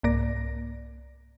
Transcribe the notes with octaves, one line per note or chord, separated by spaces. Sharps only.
C2 G#2 A#3 D5 A#6